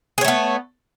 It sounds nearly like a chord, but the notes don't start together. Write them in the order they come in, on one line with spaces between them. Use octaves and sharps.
G#4 C#5 A3 B3